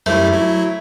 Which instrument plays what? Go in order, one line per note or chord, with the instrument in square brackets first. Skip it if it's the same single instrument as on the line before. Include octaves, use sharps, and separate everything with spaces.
[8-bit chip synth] F#2 G3 E4 [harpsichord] A3 C5
[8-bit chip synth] F#3 E4